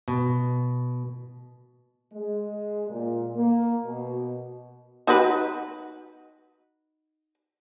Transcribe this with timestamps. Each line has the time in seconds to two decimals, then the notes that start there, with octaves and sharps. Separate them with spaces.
0.08 B2
2.13 G#3
2.90 A#2
3.35 A#3
3.85 B2
5.07 D#4 F#4 B4